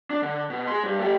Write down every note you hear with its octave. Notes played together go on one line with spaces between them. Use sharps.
D4
D3
B2
G#4 C6
G2
A3 G4